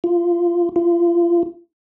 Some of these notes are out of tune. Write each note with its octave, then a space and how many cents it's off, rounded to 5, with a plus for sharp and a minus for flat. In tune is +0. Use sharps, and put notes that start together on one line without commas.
F4 -15
F4 -30